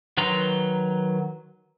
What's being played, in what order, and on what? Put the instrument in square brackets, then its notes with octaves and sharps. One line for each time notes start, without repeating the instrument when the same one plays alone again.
[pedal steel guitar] D#3 F#3 B4 A#5 C6